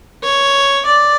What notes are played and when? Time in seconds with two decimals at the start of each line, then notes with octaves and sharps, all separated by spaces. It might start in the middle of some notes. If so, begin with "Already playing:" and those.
0.24 C#5
0.86 D5